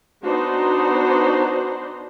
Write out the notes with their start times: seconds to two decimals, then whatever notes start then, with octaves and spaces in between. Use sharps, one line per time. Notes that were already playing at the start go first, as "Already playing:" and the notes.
0.23 B3 D4 D#4 F#4 C5